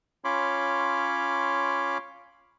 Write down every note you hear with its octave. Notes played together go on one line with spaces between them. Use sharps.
C#4 F4 C#5 B5 C6 D6